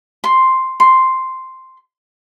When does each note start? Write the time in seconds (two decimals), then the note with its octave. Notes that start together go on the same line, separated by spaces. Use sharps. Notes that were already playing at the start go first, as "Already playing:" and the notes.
0.24 C6
0.80 C6